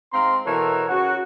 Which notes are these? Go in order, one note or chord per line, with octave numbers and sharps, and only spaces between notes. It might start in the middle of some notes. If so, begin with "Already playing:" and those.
G#2 C4 F5 A#5 C6
B2 E3 A4 A#4 C#5
C#3 F#4